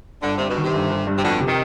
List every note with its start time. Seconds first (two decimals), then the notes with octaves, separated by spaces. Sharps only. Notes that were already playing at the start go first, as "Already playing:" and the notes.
0.23 G1 D3
0.37 G2 C3
0.50 B2
0.57 D#3
0.64 C3
0.74 G1
0.90 G1
1.07 G2
1.18 C3
1.23 F2 B2 D3
1.40 C3
1.48 D#3